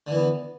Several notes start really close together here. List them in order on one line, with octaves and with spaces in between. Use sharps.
D3 E3 B3